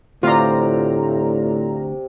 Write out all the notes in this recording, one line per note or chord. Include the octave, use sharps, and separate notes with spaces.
D2 A2 C3 F4 D5 A#5